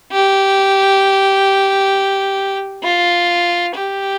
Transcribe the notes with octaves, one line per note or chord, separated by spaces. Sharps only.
G4
F4
G4